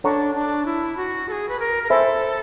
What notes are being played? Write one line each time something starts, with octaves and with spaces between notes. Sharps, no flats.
D4 A4 C#5 F#5 A#5 C#6
D4
E4
F#4
A4
G#4
B4
A#4
A#4
A4 C5 E5 G#5 B5